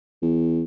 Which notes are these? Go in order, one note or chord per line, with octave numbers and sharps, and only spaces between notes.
E2